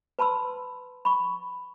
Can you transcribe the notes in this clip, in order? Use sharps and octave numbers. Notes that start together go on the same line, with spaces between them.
B4 A5 B5 C6 E6
B5 C#6